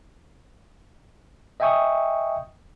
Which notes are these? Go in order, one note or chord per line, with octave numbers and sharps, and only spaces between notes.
D#5 E5 G5 G#5 C#6 D#6